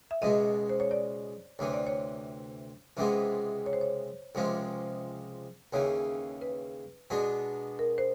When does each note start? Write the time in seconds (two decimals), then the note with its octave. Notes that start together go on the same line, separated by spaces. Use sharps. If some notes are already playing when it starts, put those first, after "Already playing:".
0.11 E5
0.22 C#2 B2 G#3 D#5
0.69 C5
0.80 C#5
0.91 D5
1.59 D2 C3 E3 C#5
1.73 D5
1.87 C#5
2.97 C#2 C3 E3 G#3 B3
3.66 C#5
3.73 C5
3.81 C#5
4.35 C#2 C3 F3 G#3
5.73 D#2 C#3 E3 C#5
6.42 B4
7.10 B2 G#3 B3 D4
7.79 A#4
7.98 C5